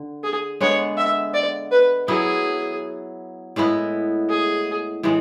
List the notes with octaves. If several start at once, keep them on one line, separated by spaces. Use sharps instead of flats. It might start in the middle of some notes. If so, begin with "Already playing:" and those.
Already playing: D3
G#4
D3 G#3 B3 C#5
E5
D5
B4
F#3 B3 E4 G#4
A2 G#3 B3 E4
G#4
A2 E3 G#3